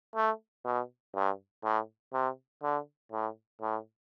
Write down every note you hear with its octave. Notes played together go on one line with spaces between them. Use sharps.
A3
B2
G2
A2
C3
D3
A2
A2